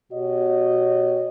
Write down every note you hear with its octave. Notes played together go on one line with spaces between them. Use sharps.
B2 F#4 G4 C#5 D#5